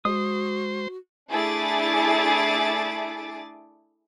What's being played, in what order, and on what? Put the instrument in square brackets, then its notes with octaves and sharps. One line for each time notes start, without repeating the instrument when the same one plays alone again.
[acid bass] G#3 [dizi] F#4 [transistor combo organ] C5 [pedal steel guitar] D#6
[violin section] A3 D4 E4 G#4 D6 A6